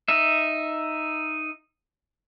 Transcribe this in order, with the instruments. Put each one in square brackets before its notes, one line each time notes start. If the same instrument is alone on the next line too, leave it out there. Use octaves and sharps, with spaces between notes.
[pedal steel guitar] D#4 E5